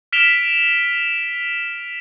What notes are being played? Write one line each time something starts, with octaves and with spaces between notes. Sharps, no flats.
F6 B6 D7 E7 F7 G7